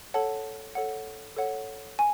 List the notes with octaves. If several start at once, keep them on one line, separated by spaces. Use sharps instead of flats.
A4 C#5 F#5 A5
A4 C#5 F#5
A4 C#5 F#5
G#5